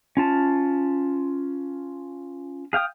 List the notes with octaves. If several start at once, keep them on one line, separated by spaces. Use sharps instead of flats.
C#4 F4 A5
G#4 F5 G5 D#6